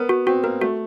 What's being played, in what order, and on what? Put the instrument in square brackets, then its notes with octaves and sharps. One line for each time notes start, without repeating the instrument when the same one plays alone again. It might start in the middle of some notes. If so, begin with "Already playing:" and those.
Already playing: [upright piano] B3 [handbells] A#4
[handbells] F#4
[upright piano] C4 [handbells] F#4
[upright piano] A#3 [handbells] A#4
[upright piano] A3 [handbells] F#4